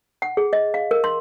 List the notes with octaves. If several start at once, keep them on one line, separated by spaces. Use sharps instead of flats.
F#5
G#4
D#5
F5
A#4
C6